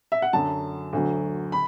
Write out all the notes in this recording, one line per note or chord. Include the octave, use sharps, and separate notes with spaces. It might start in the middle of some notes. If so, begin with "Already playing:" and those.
E5
F#5
F#2 D3 F#3 A5
D2 D3 F#3
B5